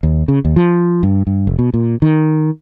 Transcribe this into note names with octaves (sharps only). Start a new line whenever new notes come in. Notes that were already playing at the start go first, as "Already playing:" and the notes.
D#2
C#3
D#2
F3
G2
G2
F1
B2
A#2
D#3